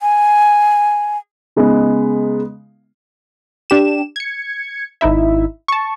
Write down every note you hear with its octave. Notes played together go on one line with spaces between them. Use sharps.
G#5
C#3 G#3 B3 D#4
D4 G4 E7
G#6 C#7
G#1 D#4 E4 E5
A5 C#6